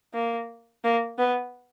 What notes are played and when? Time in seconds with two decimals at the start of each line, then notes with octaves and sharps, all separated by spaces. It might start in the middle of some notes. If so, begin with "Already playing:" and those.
0.14 A#3
0.84 A#3
1.18 B3